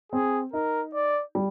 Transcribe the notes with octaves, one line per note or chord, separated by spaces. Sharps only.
C4 G#4
D#4 A#4
D5
G3